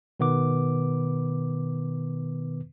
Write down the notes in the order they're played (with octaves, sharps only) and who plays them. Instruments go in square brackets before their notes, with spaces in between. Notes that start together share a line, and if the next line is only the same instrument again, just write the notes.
[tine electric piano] B2 D#3 B3 B4 D6